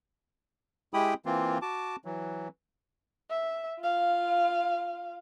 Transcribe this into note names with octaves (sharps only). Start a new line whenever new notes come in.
G#3 E4 G4 G5 B5 D#6
E3 A#3 C4 F4
F#4 A5 D6
E3 F#3
E5
F4 F5